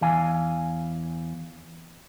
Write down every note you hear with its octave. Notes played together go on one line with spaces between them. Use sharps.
E2 E3 F5 G#5